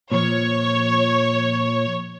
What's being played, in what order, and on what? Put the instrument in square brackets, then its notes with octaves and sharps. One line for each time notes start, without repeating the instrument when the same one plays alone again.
[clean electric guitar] A#2 F3 [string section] C#5